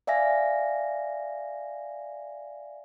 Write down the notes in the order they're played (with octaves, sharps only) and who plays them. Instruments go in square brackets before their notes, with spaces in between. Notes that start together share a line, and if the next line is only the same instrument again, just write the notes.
[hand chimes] D5 E5 F5 G#5 A#6